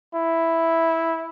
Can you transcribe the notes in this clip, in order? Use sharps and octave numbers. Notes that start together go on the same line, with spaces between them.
E4